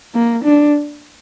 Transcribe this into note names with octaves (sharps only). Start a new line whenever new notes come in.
A#3
D4